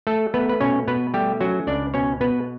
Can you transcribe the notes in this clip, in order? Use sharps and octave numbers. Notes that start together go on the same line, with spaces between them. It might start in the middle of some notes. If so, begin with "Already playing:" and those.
A3 A4
A3 B3 B4
B4
B2 C#4 C#5
B2 B3 B4
G3 A3 G4
F#3 C#4 F#4
C#2 D4 D5
B2 C#4 C#5
B2 B3 B4